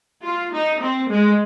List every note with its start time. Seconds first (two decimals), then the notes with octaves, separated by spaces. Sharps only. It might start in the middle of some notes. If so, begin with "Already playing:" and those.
0.24 F4
0.53 D#4
0.81 C4
1.10 G#3